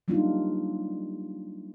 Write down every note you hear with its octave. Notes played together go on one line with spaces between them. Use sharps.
F#3 G3 A#3 D4 D#4 F4